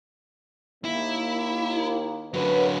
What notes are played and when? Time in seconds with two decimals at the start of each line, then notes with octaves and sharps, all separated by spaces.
0.85 D#2 A#3 E4
2.34 F#2 D3 F#3 B4